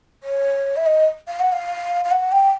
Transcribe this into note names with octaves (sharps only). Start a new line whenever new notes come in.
C#5
E5
D#5
F5
F#5
F5
F5
F#5
G5